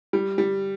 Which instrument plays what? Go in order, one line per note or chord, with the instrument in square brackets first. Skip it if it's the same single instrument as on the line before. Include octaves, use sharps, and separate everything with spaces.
[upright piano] G3
G3